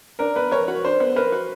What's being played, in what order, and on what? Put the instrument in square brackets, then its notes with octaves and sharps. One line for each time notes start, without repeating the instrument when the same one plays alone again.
[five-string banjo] D4 [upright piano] A#4
[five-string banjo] B3 [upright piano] B4
[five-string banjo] A#4 [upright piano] C#5
[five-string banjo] F#4
[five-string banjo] D4 [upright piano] C5
[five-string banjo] B3
[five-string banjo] A#4 [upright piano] B4
[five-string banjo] F#4